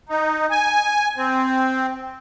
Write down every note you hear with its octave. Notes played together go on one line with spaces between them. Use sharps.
D#4
G#5
C4